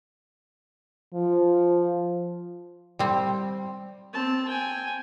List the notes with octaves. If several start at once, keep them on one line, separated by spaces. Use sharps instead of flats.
F3
G3 C4
C4 A5
G5 G#5